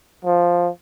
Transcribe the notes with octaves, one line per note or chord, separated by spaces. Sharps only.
F3